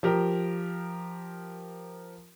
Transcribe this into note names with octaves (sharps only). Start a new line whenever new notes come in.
F3 G4 A#4